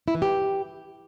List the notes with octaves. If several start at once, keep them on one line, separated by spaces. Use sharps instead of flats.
E4
E3
G4